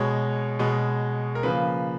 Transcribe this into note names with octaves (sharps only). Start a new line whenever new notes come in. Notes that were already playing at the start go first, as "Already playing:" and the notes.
Already playing: B2 G#3 C#5
B2 G#3
A#4
C#3 F3 A#3 B4